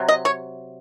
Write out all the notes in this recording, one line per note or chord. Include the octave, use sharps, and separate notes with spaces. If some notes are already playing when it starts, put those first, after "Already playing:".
Already playing: C3 F#3
D#5
C#5